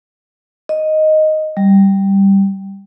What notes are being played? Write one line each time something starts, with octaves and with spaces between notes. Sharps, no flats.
D#5
G3